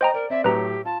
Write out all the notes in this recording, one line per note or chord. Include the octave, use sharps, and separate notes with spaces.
C5 D#5 G5 A#5
A#4 D5
C4 D5 E5
A2 F#3 G4 B4 A#5
F4 A5